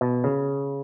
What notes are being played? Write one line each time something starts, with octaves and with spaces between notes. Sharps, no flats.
B2
C#3